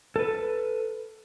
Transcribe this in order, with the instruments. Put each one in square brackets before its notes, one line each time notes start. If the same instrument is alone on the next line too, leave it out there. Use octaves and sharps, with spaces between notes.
[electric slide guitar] A4 B4